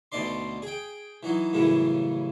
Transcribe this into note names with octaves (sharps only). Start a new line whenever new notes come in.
D2 B2 D#4 D5 C6
G#4 G5
E3 F#3 D#4
F#2 A2 C#3 E3 G3